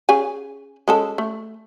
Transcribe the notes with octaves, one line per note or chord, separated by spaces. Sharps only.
C#4 G#4 G#5
G#3 C#4 A4
A3